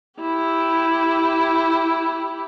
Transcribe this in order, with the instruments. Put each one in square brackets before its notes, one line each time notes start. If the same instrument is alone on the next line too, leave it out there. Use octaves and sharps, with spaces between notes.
[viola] E4 G4